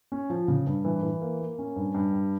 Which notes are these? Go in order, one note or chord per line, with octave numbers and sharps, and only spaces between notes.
C#4
F3
C#3
G2
E3
E3
A#3
A#3
C#4
G2
G2
G3